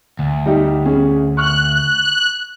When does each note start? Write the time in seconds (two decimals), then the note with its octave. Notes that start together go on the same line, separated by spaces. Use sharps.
0.19 D2
0.46 G3 D#4 G4
0.85 C#4 G#4
1.37 C#6 F6 F#6